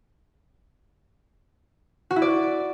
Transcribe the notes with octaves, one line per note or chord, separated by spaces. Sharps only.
F#4
E4
D5